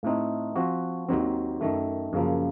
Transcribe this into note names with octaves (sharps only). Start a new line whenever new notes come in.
A2 A3 C4 D#4
F3 C4 F#4
D#2 D#3 F#3 C4
F#2 D#3 A3
F#2 C#3 F3 A#3